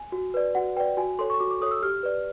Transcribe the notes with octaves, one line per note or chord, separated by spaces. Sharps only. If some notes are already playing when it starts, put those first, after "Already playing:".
Already playing: G#5
F#4
B4 D5
F#4 F#5
B4 D5 G5
F#4 G#5
A4 C#5 C6
C#6
F#4 D6
D6
A4 C#5 D#6
E6
G4 F6
B4 D5